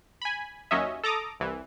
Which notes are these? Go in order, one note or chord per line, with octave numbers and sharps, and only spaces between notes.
G#5 B5
D#2 F#3 C#4 D#5 E5
A4 A#5 D6 D#6
C2 E3